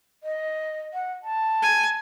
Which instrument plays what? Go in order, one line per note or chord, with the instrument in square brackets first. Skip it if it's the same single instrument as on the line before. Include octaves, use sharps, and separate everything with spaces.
[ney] D#5
F#5
A5
[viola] G#5